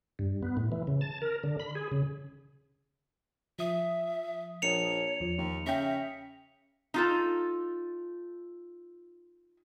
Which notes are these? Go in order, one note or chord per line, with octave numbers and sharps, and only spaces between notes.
G2
B3
A2
E3
C#3
A5
A#4
D3
B5
G#4
C#3
F3 E5 D#6
A#1 C#5 C#7 F7
E2 F3
D#2
C#3 E5 G5 A#6 B6
D#4 F4 A4